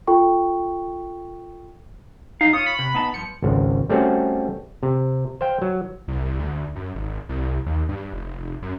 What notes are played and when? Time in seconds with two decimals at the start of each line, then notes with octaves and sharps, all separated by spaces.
0.07 F4 A4 G5 C#6
2.41 F2 D#4 F5
2.53 F4 C#5 D#6
2.66 B5
2.79 C3
2.94 B3 D#4 A5
3.14 G2 F3 C#7
3.42 G#1 C#2
3.90 G3 A3 C4 C#4 F#4
4.83 C3
5.41 C5 F5 G5
5.62 F#3
6.08 C2
6.25 C2
6.39 D2
6.76 F#2
6.95 G#1
7.29 C2
7.66 D#2
7.89 G2
8.13 F1
8.33 F1
8.62 F#2